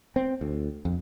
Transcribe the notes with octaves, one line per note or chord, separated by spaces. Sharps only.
C4
D2
F2